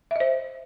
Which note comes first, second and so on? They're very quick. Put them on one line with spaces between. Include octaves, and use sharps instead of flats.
E5 D#5 C5